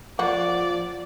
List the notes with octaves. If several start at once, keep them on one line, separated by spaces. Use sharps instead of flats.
F3 A#3 F#4 D5